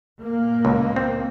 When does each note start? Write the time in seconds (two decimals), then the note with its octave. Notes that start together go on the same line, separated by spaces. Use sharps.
0.22 A#2 A#3
0.65 C#2
0.96 C4